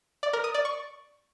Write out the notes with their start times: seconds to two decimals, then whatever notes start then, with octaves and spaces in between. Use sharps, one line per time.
0.23 D5
0.33 A#4
0.44 D#6
0.54 D5
0.65 C#6